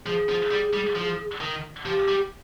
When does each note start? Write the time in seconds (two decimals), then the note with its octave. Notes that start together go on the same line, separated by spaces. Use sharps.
0.06 F3 G#4
0.29 F3
0.51 G3
0.74 G3
0.96 F3
1.41 D#3
1.85 F3 G4
2.08 G3